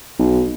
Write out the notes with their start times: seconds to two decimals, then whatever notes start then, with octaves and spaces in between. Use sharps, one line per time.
0.19 B1